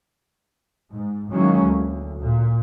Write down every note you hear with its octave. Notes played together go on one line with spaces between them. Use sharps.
G#2
D#3 E3 F#3 G#3 A#3 C#4
D2
A#2